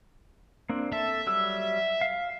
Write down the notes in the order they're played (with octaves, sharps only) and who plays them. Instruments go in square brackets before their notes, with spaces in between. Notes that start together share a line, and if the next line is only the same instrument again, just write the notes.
[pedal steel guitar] A#3 C4 D4
[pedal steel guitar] A4 A5 [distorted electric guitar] E5
[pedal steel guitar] F#3 G3 E6
F5